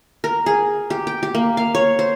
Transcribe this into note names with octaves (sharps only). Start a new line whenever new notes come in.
A#4
G#4
G4
G5
G4
A#3
F5
C#5
C5